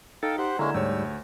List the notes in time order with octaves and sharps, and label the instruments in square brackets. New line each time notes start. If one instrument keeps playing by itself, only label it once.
[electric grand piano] D#4 [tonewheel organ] A4 [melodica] F5 G5
[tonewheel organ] G4 [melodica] C5 F#5
[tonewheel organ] D3 E4 [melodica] G#3 A#3 C#4 [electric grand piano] A#5
[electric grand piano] D2 C#5 [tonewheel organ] G#2 G3 [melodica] E6